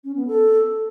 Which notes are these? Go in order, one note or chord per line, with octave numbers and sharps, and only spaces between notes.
C#4
B3
A4